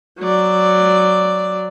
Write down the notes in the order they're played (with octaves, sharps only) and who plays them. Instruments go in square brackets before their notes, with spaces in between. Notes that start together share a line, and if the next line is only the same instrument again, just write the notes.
[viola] F#3 D5